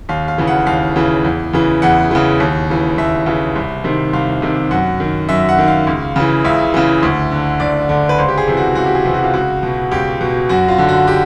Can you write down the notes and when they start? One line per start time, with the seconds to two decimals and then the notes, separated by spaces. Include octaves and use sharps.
0.09 D#2 F5
0.28 F5
0.38 C#3 E3
0.47 F#5
0.66 D#2 F5
0.96 C#3 E3
1.25 E2
1.53 C#3 E3
1.82 E2 F#5
2.11 C#3 E3
2.40 D#2
2.70 C#3 E3
2.98 D#2 E5
3.26 C#3 E3
3.56 C2
3.84 C3 D#3
4.13 C2 F5
4.42 C3 D#3
4.71 F#2 F#5
5.00 D#3
5.29 F#2 E5
5.49 F#5
5.59 D#3
5.68 F5
5.87 C#2
6.16 C#3 E3
6.45 C#2 E5
6.74 C#3 E3
7.03 D2
7.32 D3
7.60 D2 D5
7.89 D3
8.09 B4
8.18 C#2 C5
8.28 G4
8.38 G#4
8.48 C3 E3
8.57 F#4
8.75 C#2 F#4
8.86 G4
8.95 G#4
9.05 C3 E3
9.14 F#4
9.24 F4
9.34 C#2 F#4
9.63 B2
9.92 C#2 G4
10.21 B2
10.49 F#2 F#4
10.68 F4
10.78 D3
10.89 F#4
11.08 G4